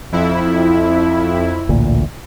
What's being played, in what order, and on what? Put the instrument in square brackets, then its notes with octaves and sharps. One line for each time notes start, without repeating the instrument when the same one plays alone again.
[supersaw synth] F2 E4
[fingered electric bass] A1 D2 A#2